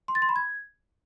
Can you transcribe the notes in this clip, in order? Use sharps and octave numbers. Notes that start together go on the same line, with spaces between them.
C6
A6
C6
B5
G#6